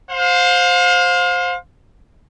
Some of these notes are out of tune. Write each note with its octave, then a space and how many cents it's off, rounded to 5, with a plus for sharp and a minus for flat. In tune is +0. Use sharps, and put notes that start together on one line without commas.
C5 +0 F5 +35